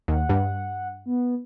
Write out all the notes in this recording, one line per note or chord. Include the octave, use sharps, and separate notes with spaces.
D#2 F#5
G2
B3